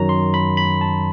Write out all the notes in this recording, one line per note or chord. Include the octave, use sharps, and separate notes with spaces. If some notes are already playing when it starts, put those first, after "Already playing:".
Already playing: F#2 D#3 F#3 A#5
C6
B5
B5
A5